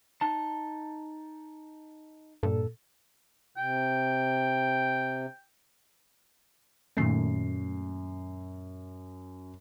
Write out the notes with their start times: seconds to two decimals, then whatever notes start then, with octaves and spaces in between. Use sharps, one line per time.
0.21 D#4 A5
2.43 G2 A#2 A4
3.57 C3 G5
6.97 F#2 A#2 D#3 A3 C7